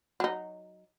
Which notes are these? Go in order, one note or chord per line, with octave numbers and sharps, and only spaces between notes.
F#3 D#4